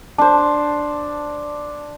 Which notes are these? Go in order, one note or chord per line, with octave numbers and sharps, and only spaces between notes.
D4 C5 A5